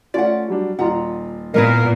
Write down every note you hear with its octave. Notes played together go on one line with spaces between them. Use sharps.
A3 C#4 F4 D5 F#5
F#3 G3 D4
D#1 F4 F#5 A#5
A#2 B3 E4 A#4 B4 D#5